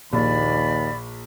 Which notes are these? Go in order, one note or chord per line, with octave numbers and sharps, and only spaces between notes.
A#1 D#2 D5 B5